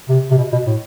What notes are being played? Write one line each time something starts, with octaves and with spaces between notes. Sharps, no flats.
C3
C3
B2
B2
A2